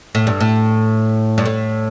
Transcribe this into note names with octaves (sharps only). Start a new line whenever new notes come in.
A2
G2
A2
G2
A2